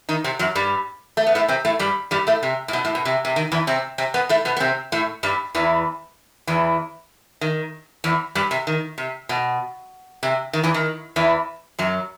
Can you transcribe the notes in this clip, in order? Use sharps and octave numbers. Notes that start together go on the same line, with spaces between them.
D#3 D#4
C3 C4
F#2 F#3
G2 G3
A3
B3
A2 A3
C3 C4
A2 A3
G2 G3
G2 G3
A2 A3
C3
A2
B2
A2
B2
C3
C3
D#3
E2 E3
C3 C4
C3 C4
B2 B3
A2 A3
B2 B3
B3
C3 C4
A2 A3
G2 G3
E2 E3
E2 E3
D#3
E2 E3
G2 G3
C3
D#3
C3
B2
C3
D#3
E2 E3
D#3
E2 E3
F#2 F#3